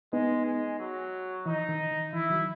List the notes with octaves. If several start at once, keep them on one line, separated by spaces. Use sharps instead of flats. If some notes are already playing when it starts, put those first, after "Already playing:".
G#3 B3 D#4
G#3
F#3
E3 D#4
D#3
D#3
E3 E4
D#3 F#3